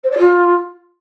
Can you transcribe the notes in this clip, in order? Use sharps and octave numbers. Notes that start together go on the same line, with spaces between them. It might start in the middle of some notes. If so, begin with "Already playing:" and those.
C5
D5
F4